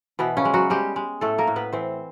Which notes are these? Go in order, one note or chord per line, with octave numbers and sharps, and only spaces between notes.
B2 E3 B3
C#3 C#4
G#3
F#3 F#4
G3 G#3 G4
G#3
A2 A3 A4
A#3 A#4
A2
B3 B4
E3 C4 C5